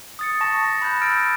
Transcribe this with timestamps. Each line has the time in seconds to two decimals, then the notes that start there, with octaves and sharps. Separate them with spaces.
0.19 D#6 A6 C#7
0.41 A5 C#6 A#6 E7
0.64 A#6
0.82 B5 F#6 G6 A6
1.01 E6 F6 G6 A6 A#6 D7